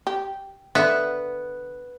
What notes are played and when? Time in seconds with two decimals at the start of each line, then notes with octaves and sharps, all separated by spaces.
0.07 G4
0.75 D3 B3 E5